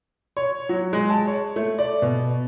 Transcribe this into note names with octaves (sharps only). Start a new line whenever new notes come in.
C#5
F#3
G#3
A5
C#5
A3
D5
B2